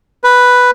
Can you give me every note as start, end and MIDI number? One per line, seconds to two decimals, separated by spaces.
0.24 0.71 71